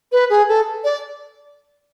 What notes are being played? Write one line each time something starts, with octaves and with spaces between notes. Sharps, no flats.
B4
G#4
A4
D5